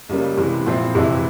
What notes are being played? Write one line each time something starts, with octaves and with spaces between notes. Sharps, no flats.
C#2 C#3 G3 A#3
C3 E3 G#3
A#2 F3 C4 E4
F2 C3 E3 G#3 E4